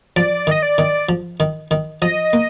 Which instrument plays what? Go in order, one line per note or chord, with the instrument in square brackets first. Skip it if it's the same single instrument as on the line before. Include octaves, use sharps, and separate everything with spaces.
[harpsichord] F3 [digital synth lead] D5
[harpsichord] D#3 [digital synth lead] D#5
[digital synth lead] D5
[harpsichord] D#3
F3
D#3
D#3
[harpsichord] F3 [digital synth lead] D#5
[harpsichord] A#3